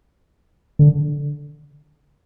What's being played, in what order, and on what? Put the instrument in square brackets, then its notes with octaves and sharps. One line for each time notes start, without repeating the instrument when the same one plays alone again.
[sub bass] D3